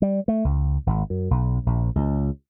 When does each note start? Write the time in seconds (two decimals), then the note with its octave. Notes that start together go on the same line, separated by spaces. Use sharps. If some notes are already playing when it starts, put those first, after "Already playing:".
0.02 G3
0.28 A3
0.44 C#2
0.87 G#1
1.10 F#2
1.31 B1
1.66 A#1
1.95 C#2